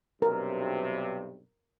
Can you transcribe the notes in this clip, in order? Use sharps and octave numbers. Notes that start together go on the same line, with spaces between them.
B1 G2 C3 A#4